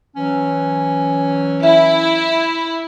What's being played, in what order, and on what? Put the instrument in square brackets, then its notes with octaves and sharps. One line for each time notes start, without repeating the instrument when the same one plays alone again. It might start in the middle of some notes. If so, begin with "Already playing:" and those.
[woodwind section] E3 F#3 C#4
[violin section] E4 [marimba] E5